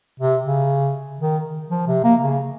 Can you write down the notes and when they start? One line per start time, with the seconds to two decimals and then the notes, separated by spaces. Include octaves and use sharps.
0.20 C3
0.44 C#3
1.21 D#3
1.70 F3
1.87 C3
2.04 A#3
2.22 C#3